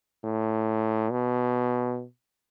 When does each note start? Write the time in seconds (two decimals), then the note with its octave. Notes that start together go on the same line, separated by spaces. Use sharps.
0.24 A2
1.11 B2